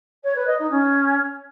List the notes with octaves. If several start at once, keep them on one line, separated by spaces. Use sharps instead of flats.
C#5
B4
D#5
D#4
C#4